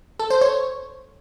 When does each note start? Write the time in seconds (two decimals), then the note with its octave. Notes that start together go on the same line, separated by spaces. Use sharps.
0.19 A4
0.30 C5
0.41 C#5